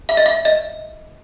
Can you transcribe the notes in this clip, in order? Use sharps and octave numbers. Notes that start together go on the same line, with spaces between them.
E5
D#5
E5
D#5